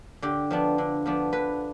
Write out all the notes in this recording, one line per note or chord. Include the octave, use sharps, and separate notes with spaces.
D3 G4
F3 B3 D4
D3
F3 B3 D4
D3 B4